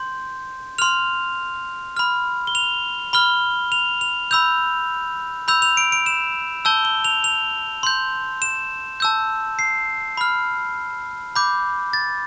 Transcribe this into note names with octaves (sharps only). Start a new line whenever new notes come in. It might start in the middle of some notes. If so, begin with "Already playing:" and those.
Already playing: C6 G6
C6 F6 F7
B5 F6
G7
F7
B5 F6 G7
F7
F7
B5 E6 G6 F7
B5 E6 G6 F7
F7
D7
D7
E7
A5 E6 G6 G7
G7
F7
F7
C6 G6
E7
A5 E6 G6
C7
B5 F6
B5 D6 G6
A6